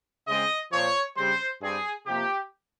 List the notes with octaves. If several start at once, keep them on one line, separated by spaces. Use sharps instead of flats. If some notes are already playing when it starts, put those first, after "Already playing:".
C#3 G#3 C4 D#5
A#2 F3 C4 C#5
C#3 G3 C4 C5
G2 G3 C4 G#4
C3 F3 A#3 G4